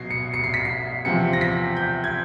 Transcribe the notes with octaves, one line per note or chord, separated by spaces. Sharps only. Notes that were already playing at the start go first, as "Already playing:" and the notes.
Already playing: B2 F#3 C7
C#7
C#7
C7
B6
C7
E2 C3 F3 C#7
A#6
B6
G6
G#6